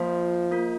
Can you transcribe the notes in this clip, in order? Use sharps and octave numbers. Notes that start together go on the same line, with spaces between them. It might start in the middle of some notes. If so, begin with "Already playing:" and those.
Already playing: F3 A#3 F4 C5
A#3 F4 A#4